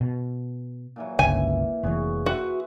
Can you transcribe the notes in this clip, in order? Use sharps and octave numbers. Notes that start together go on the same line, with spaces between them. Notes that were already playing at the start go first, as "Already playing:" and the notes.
B2
A#2 E3 F#3
G1 C#2 C#3 E4 G#5
F1 E3 F#4 G#4 C#5
F#4 B4 E5 C6